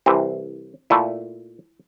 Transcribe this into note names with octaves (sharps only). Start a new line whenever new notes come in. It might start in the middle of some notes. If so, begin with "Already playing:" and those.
C2 C3 E3 C4
A#2 A3 E4